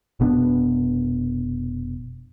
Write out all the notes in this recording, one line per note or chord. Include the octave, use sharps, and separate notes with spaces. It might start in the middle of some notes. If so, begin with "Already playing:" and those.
F1 B2 B3 D4